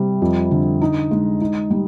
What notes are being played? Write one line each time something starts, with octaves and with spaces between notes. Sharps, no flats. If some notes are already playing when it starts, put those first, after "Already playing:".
Already playing: C3 G3
F2
D3
D#4
G#3
D#4
G3